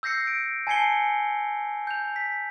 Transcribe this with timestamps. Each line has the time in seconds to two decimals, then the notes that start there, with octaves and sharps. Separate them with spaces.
0.03 E6 G6 A#6 C7 C#7
0.27 D7
0.67 G#5 A5 G#6 C7 C#7 G7
1.87 G6 F7
2.16 B6